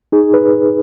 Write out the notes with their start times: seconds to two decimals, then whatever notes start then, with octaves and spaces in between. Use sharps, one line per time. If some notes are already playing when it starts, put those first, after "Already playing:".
0.12 D#4 G#4
0.34 B4